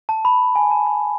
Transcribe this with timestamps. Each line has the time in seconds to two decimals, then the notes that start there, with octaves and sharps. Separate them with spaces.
0.09 A5
0.25 B5
0.55 G#5
0.71 A5
0.87 B5